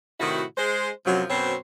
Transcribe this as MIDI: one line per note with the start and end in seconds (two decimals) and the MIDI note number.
0.20 0.43 45
0.20 0.43 48
0.20 0.43 51
0.20 0.43 64
0.20 0.43 66
0.57 0.89 56
0.57 0.89 72
1.06 1.23 42
1.06 1.23 48
1.06 1.23 53
1.06 1.23 54
1.30 1.55 42
1.30 1.55 47
1.30 1.55 54
1.30 1.55 60
1.30 1.55 72
1.30 1.55 73